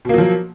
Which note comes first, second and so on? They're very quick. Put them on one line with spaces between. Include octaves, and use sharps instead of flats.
B2 A#3 F#3 F3